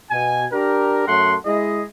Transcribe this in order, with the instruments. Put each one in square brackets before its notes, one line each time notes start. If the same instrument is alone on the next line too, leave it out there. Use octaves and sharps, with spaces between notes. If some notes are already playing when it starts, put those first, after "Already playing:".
[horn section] B2 G#5
D4 G4 A#4
F#2 A3 F#5 C6
G#3 E4 G#4 D#5